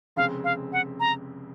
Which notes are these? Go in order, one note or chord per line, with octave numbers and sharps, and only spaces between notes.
F1 F2 C#3 G#3 C4 F5
F5
F#5
A#5